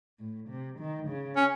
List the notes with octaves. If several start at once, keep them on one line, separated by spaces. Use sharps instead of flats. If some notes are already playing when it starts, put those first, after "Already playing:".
A2
C3
D#3
C#3
C#4